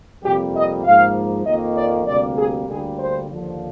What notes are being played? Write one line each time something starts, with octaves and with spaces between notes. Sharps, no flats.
F2 C3 G3 A#3 G4
D#5
G#2 F3 A#3 F5
F2 D#3 A#3 D#5
D5
D2 C3 G3 A#3 D5
G#4
D2 D3 G3 A#3 G#4
C5
D#2 D3 F3